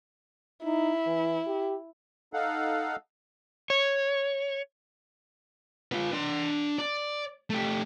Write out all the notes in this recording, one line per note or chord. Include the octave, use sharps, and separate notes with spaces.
D#4 E4
E3
G4
D#4 A4 F5 F#5
C#5
F4 B4
D4 C6
D5
A3 G4